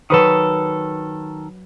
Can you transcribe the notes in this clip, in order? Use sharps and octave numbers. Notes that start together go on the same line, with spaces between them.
D#3 F#3 A4 B4 D#6